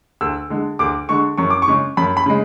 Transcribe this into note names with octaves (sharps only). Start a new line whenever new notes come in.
D2 E6
D3 G#3
D2 D6
D3 G#3 C#6
F#2 C#6
D6
C#6
C#3 G#3
F#2 B5
B5
C#3 G#3